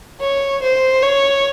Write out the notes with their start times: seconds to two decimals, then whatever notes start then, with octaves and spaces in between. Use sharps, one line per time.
0.20 C#5
0.62 C5
1.03 C#5